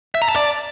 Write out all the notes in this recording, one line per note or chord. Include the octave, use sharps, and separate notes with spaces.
E5
A#5
A5
D5